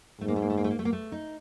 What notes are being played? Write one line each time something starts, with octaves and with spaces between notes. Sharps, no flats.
G#2 A3
A#3
A3
A#3
A3
A#3
A3
A#3
A3
A#3
A3
D#4